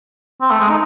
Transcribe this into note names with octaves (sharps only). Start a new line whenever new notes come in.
C4
A3
G#3
D#4